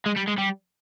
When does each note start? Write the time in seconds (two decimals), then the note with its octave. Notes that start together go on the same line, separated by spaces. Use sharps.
0.06 G#3
0.16 G3
0.28 G#3
0.38 G3